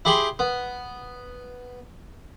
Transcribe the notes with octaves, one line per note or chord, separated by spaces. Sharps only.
E4 G4 G#4 G5 B5 C6
B3